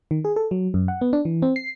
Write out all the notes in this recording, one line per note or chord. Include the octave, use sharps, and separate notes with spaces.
D#3
G#4
A4
F#3
F#2
F#5
B3
D4
E3
C4
C7